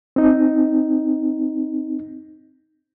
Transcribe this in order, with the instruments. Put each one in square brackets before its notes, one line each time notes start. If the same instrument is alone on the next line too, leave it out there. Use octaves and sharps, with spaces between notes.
[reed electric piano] C4 D#4